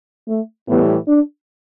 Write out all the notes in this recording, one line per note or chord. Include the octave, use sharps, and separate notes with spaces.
A3
A2 E3 G3 B3 E4 G4
D4